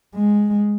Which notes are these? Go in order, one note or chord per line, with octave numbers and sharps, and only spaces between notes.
G#3